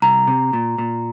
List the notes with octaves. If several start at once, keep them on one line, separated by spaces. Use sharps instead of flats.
C2 A#5
C3
A#2
A#2